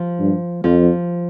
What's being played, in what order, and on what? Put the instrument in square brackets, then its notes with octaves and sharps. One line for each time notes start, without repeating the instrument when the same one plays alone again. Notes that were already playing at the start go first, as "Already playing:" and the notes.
Already playing: [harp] F3
[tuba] G2
[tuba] F2 [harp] F3